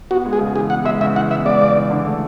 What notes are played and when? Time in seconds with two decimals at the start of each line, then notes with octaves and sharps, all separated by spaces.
0.11 B3 F#4
0.26 G#3
0.33 G#4
0.41 C#3
0.56 E3 G#4
0.70 B3 F#5
0.85 G#3 E5
1.01 C#3 E5
1.16 E3 F#5
1.31 B3 E5
1.45 G#3 D5
1.61 C#3
1.76 E3
1.90 D3
2.06 A3